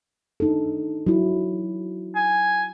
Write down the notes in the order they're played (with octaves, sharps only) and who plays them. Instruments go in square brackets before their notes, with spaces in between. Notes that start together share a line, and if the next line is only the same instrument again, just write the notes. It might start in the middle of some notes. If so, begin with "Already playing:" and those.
[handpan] D4 D#4 A4
F#3 E4
[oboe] G#5